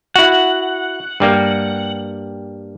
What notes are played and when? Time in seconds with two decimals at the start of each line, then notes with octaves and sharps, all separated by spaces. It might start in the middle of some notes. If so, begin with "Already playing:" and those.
0.16 E4 F#4 F#5
1.20 G2 G3 A#3